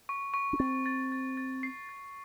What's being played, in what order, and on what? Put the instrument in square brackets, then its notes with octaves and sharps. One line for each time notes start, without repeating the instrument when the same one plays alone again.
[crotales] C#6
C#6
[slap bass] C#4
[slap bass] C4 [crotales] A6
[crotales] A6
A6
A6
C7
A6